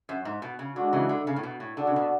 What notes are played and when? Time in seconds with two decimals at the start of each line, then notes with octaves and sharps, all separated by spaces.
0.09 F#2
0.25 G#2
0.42 B2
0.59 C#3
0.76 D3 G#3 D4 F#4
0.93 C#3 E3
1.09 D3
1.27 C#3
1.36 A2
1.43 B2
1.60 A2
1.77 D3 F#4 A4 D5 F#5
1.87 C#3
1.96 B2